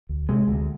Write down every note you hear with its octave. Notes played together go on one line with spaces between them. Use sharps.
D2
C3 G#3
D2